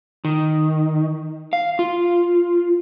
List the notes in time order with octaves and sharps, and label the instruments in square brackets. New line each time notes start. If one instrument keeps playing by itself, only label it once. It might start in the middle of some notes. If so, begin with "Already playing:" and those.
[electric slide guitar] D#3
F5
F4